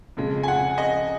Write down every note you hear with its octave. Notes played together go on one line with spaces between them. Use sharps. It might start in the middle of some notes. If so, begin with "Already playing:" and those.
F2 C#3 G#3
G#5
F#5
D#5